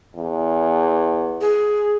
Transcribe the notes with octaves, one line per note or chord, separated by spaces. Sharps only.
E2
G#4